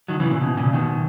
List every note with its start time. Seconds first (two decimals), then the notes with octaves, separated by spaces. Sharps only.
0.08 D#3 F#3
0.20 C#3 E3
0.30 A#2 C#3
0.41 B2
0.57 A#2 C#3
0.73 B2 D#3